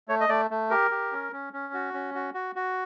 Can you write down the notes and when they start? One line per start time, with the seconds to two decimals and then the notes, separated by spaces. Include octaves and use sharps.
0.08 A3 C#5
0.21 D#5
0.29 A3 D5
0.51 A3
0.70 G4 A#4
0.91 G4
1.12 C#4
1.33 C#4
1.53 C#4
1.74 F#4
1.94 C#4
2.15 F#4
2.34 F#4
2.55 F#4